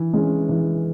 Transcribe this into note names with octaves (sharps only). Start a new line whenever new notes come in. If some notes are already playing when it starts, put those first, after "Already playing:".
Already playing: E3
G#3 C#4
E3